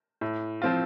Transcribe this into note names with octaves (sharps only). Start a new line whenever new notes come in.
A2
F3 C4 F4